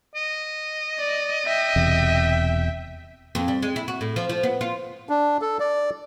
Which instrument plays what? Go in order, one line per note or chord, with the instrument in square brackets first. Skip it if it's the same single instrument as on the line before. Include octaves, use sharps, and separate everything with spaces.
[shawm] D#5
[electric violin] D5
E5 G5
[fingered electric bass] E1 E2 C3
[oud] F2
G3
G#3
E4
F#4
A2
F3
F3
B3
F4
[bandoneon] D4
A4
D5